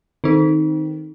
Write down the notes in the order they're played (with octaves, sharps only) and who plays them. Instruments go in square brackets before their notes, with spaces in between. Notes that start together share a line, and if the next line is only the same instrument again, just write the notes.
[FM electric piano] D#3 [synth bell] C4 D#4